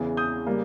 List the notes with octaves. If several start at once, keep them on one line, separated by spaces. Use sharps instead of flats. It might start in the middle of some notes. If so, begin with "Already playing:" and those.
Already playing: E2 C#3 E3
D#6 G6
C#3 G3 A#3